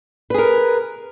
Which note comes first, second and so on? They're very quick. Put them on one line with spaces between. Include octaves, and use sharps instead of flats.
B4 G#4 A#4